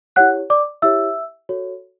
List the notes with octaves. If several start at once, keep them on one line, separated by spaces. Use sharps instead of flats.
E4 G4 C#5 F#5 F#6
D5 D6
E4 G4 C#5 E5 E6
F#4 A4 C#5